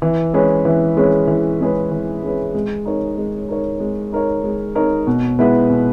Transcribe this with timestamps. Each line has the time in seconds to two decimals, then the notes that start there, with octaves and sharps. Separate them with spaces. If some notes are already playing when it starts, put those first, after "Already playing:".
0.02 E3
0.34 G#3 C#4 G#4 B4
0.65 E3
0.97 G#3 C#4 G#4 B4
1.27 E3
1.60 G#3 C#4 G#4 B4
1.92 E3
2.23 G#3 C#4 G#4 B4
2.54 G#3
2.85 D#4 A#4 C#5
3.18 G#3
3.49 D#4 A#4 C#5
3.80 G#3
4.12 D#4 A#4 C#5
4.44 G#3
4.75 D#4 A#4 C#5
5.07 B2
5.39 G#3 B3 E4 B4
5.70 B2